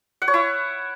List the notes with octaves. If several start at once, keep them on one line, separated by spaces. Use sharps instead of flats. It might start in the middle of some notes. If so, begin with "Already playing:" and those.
F#5
C#5
E4